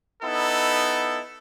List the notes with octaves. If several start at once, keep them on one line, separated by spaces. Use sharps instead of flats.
B3 D#4 E4 A4